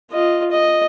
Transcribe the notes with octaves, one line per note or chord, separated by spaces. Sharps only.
F4 D#5
D#5